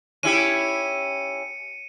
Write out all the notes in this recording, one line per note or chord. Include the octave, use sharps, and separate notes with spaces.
C#4 E4 G4 C#7 D#7